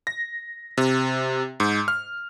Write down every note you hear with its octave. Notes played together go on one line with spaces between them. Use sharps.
A#6
C3
G#2
F6